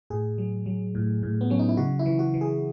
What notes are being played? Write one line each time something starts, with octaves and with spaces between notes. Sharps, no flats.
A2 G#4
F#3
F#3
A2
A2
B3
F#3 C#4
D#4
E4
C#3 F#4
E4
E3
F#4
E3
G#4